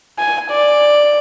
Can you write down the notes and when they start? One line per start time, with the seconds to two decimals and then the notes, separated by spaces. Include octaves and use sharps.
0.19 G#5
0.51 D5